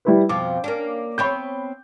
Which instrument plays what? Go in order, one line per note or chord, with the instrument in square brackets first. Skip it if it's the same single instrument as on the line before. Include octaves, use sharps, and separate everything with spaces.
[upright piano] G3 E4 B4
[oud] F2 B2 F3 [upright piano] D6
[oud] A#3 C#4 D4
[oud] B3 C4 C#5 [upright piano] B5 G6